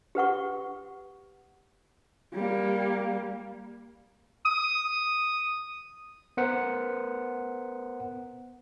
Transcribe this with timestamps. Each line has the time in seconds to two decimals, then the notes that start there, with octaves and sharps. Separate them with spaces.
0.15 G4 B4 F#5 C#6
2.33 G3 A#3
4.46 D#6
6.37 B3 A#4 C5 F#5